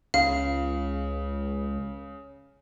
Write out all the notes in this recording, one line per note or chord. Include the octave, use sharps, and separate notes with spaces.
C#2 C#3 F5